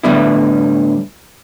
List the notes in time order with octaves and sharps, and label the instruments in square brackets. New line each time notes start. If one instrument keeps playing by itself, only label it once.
[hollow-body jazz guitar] A2 D3 G3 B3 E4